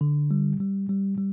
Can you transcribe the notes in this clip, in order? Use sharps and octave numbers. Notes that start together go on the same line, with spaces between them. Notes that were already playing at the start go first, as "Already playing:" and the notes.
D3
G3
G3
G3
G3